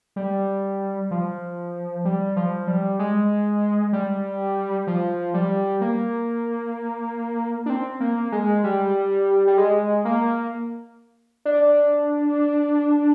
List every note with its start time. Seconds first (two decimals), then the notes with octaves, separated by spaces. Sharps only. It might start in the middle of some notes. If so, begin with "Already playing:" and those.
0.16 G3
1.11 F3
2.05 G3
2.36 F3
2.67 G3
2.99 G#3
3.93 G3
4.87 F3
5.34 G3
5.81 A#3
7.66 D4
7.70 C4
8.00 A#3
8.32 G#3
8.64 G3
9.47 G3
9.58 G#3
10.05 A#3
11.45 D4